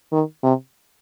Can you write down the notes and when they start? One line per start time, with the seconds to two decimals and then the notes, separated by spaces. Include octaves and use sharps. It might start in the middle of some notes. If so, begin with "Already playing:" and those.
0.12 D#3
0.43 C3